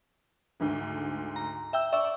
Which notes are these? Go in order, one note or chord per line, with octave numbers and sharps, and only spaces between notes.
D2 G#2 D3
A#5
E5 G5 E6
D5 E5 C#6 E6